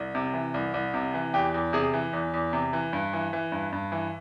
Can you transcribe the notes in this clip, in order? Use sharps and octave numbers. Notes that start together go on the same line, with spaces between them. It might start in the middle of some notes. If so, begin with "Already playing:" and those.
Already playing: C2
C3
E3
C2
C2
C3
E3
E2 G4
E2
C3 G#4
E3
E2
E2
C3
E3
G2
E3
E3
G2
G2
E3